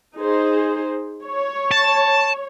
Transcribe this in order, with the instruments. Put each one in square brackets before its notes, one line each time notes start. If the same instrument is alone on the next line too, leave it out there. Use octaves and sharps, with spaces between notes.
[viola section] D#4 G#4 C5
C#5
[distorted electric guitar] A5